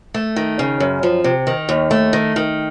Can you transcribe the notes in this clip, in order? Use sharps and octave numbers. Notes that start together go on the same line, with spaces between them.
A3
D#3
C#3
F#2
F3
C3
D#3
D#2
A3
D#3
D#3